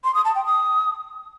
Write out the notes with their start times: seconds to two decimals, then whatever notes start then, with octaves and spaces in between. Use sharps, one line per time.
0.04 C6
0.14 D#6
0.25 A5
0.35 G5
0.45 D#6